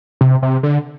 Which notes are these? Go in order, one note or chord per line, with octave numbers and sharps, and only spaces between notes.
C3
C3
D3